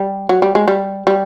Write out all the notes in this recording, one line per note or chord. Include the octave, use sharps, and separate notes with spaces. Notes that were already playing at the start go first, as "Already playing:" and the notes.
Already playing: G3
F#3
G3
G#3
G3
G3